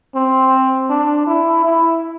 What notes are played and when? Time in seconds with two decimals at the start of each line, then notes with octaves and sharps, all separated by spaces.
0.15 C4
0.90 D4
1.27 E4
1.65 E4